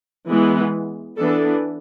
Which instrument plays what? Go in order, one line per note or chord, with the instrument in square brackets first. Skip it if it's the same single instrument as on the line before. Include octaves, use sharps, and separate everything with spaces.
[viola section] E3 G#3 B3
E3 B3 D4 A4